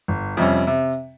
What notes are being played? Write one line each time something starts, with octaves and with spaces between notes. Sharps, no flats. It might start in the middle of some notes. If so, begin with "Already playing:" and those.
G1
F2 C3 G3 C#4
C3